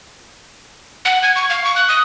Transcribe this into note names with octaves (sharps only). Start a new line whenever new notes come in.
F#5
G#6
C#6
F5
C#6
F#6
D#6